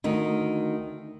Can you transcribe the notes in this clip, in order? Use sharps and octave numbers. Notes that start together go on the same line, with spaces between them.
D2 D#3 D#4